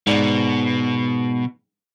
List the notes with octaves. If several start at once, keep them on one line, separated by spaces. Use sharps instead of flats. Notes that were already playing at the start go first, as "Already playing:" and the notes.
G#2 B2 D5